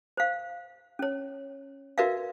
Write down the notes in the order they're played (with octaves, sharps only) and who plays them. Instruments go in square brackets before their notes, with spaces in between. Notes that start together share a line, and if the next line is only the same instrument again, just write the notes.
[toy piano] C5 F5
C#4 C#5
F#4 A#4 B4 D5 E5 F5